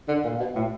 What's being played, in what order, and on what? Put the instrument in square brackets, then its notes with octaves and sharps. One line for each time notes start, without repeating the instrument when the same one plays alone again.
[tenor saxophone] D3
A#2
B2
A2